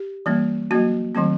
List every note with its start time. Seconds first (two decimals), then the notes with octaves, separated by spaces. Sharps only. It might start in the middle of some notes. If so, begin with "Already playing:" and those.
Already playing: G4
0.26 E3 G3 A#3 C#4
0.71 F#3 A#3 C#4 F#4
1.15 D#3 F#3 A3 C4